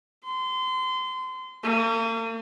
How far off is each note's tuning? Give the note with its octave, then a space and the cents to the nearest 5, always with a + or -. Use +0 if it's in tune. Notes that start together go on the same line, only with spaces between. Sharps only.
C6 -30
A#3 -45